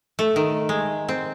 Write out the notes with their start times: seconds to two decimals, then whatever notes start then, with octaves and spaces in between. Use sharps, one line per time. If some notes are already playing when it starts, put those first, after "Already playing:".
0.19 A3
0.36 D#3
0.69 G#3
1.09 C4